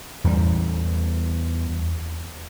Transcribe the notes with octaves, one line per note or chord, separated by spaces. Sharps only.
E2 G3